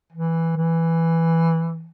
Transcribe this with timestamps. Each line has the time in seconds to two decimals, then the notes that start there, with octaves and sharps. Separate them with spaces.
0.13 E3
0.56 E3